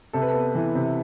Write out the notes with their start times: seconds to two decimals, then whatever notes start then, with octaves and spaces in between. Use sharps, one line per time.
0.13 C3 A4
0.22 B4
0.29 B3 A4
0.55 E3
0.75 C3